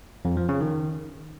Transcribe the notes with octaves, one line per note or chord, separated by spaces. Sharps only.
F2
F3
C#3
D#3